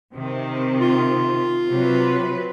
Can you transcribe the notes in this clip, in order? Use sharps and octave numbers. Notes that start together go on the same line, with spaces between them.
C3 D#3
F4
C3 F#3 B4